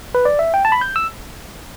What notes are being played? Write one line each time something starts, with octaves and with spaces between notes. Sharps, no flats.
B4
D5
E5
G5
A5
B5
G6
E6